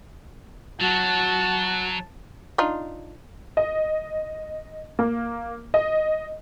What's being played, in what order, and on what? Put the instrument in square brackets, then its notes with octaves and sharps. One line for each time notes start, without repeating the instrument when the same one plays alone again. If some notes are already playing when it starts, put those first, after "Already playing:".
[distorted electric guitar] F#3 [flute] F#4 [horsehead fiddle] A5
[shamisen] D4 D#4 F4
[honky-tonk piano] D#5
A#3
D#5